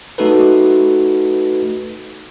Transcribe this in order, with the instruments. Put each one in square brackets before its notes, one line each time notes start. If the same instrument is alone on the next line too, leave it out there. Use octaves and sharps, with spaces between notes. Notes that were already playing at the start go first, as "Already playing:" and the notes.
[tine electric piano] A3 D#4 F#4 A4 B4